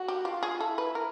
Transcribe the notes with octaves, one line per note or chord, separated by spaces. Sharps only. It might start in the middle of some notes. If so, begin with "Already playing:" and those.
Already playing: F#4
G4
F4 G4
G#4
E4 A4
B4
A#4